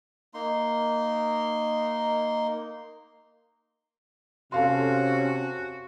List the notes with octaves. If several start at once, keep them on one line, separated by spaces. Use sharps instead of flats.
A#3 D#4 C6
C3 C#4 F#4 A4 F5 C6